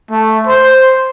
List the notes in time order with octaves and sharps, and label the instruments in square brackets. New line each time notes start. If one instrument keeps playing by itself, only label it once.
[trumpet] A3
C5